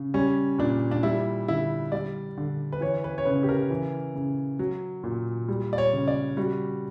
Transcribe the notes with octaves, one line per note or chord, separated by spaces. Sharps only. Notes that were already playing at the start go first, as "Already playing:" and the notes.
Already playing: C#3
G3 C#4
A#2 D4
D4
G3 E4
D3 E4
G3 D5
D3
B4
E3 C#5
B4
C#5
C#3 B4
G4
A#4
E3
C#3
F#3
A#2
G3
D5
C#5
C#3
D5
G3 F#4